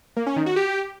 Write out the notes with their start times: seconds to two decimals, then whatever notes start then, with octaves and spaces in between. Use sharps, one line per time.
0.16 A#3
0.26 C#4
0.36 D#3
0.46 F#4
0.56 G4